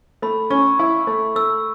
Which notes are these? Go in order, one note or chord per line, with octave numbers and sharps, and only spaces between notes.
A3 B5
C#4 C#6
E4
A3
A3 E6